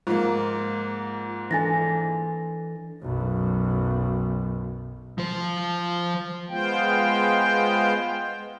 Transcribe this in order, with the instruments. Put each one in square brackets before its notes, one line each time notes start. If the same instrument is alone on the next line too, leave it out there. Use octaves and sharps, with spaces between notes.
[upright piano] G#2 F3 A#3 [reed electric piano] F4
[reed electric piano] E3 D4 A4 [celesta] G#5 A6 A#6
[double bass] B1 F#2
[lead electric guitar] F3 C5
[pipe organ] G#3 B3 F4 C5 G5